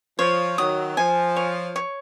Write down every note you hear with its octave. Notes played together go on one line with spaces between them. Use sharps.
F3 C#5
D#3 F#3 D#6
F3 G#5
C#5
C#5